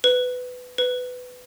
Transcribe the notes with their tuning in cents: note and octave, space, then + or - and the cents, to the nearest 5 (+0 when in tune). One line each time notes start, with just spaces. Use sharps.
B4 +15
B4 +15